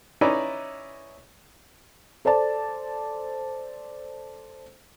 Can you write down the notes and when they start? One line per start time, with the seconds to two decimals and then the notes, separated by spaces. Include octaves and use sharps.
0.21 C#4 D#4 E4 B4 D5
2.25 A4 C5 D5 A5